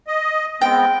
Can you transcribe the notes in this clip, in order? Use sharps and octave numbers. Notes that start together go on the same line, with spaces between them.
D#5
G#3 B3 C4 G5